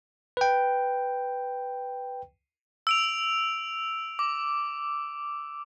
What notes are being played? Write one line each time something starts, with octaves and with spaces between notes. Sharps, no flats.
B4 G5
E6 D7 F7
D6